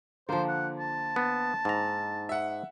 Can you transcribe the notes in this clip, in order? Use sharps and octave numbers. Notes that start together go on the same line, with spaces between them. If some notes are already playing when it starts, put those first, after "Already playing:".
D3 F3 A#3 C5
F#5
A5
B3
G#2 A#5
E5 F#5